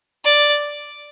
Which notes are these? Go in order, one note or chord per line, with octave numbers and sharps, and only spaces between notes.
D5